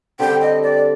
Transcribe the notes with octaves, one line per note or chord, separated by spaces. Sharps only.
D3 G3 C4 G5
D#5
D5